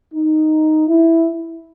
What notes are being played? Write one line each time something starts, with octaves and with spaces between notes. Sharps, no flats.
D#4
E4